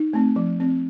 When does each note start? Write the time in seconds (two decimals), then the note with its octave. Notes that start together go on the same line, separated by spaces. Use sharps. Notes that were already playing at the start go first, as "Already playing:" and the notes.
Already playing: D#4
0.13 A3 C4
0.36 F3
0.60 C4